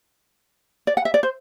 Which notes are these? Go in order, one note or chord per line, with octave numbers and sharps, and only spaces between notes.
D5
F#5
E5
D5
C5